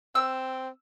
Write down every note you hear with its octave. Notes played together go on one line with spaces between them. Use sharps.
C4 E6